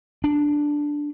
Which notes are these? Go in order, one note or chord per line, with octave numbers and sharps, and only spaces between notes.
D4